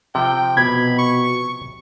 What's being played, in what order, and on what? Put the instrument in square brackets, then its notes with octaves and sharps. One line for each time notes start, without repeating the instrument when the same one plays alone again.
[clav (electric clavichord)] C3 F3 [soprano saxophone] G5
[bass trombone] B2 [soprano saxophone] B5 [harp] G#6
[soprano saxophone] C#6